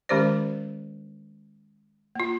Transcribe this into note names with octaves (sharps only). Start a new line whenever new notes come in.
D#3 G#3 C#4 G4 C5 D5
A#3 F4